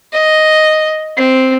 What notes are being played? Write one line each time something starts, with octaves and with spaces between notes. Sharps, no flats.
D#5
C4